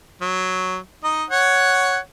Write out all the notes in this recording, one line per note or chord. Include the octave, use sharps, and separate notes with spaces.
F#3
D#4 D#5
C#5 F#5